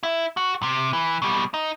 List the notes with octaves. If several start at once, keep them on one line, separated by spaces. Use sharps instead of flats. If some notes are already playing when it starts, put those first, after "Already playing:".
E4
F#4
C3
E3
B2 G3
D#4